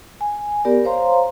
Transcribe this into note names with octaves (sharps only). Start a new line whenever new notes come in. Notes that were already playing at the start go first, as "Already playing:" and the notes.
G#5
B3 G4 A#4 D5
C5 C#5 F5 A#5 C6